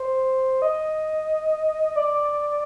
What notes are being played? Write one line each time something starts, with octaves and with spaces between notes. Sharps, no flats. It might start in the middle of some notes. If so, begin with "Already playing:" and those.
Already playing: C5
D#5
D5